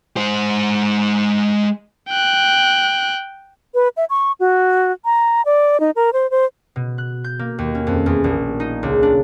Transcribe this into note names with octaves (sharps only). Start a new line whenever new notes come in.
G#3 C5
G5 F#6
B4
E5
C#6
F#4
A#5
D5
D#4
A#4
C5
C5
B2
F#6
G6
A#3
D#2
C#4
F2
E2
A#1
D#4
C#2
D4